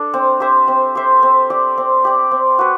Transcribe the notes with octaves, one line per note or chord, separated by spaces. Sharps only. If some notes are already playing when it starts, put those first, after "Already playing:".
Already playing: D4 A4
C4
G4 C5 E5
C4
G4 C5 E5
C4
G4 D5
C4
G4 D5
C4
F#4 B4